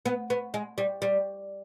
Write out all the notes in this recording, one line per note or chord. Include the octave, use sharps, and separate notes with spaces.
B3
B3
G#3
G3
G3